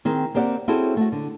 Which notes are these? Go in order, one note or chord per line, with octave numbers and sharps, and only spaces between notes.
D#3 C4 G#4
A#3 C4 G4 D5 D#5 F#5
C4 C#4 E4 F#4 G#4 A4
A3 F#4
D3